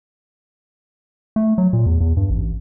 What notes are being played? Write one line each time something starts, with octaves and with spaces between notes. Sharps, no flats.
A3
F#3
A#2
E2
E2
G2
A1